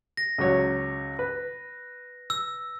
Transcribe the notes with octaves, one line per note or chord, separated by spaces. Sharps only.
A#6
C#2 F#3 C#5
B4
E6